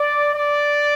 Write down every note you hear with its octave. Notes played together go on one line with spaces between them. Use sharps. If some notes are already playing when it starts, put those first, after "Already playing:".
Already playing: D5
D5